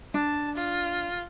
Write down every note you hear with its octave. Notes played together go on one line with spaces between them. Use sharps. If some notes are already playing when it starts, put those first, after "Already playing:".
D4 A5
F4